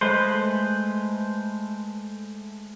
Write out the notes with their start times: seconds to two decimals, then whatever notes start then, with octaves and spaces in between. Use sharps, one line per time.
0.01 G#3 A3 B4 C5